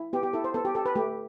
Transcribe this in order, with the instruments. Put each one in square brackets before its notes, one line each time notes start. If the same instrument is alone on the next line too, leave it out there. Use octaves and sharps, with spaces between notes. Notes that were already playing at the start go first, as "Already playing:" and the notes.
Already playing: [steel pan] E4
B3 G4
G4
E4 A4
C5
B3 A4
G4
G4 A4
B4
A3 G4